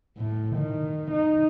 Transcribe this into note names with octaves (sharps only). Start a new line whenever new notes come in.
A2
D#3
D#4